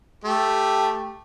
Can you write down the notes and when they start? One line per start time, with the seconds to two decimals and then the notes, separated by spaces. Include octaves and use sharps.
0.25 A3 G4